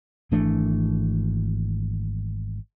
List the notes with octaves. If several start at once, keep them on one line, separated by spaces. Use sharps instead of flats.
G#1 E3 A3 D4